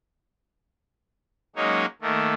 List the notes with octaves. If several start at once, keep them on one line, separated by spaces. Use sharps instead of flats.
F#3 G#3 A#3 C#4 D#4 C#5
D#3 A3 A#3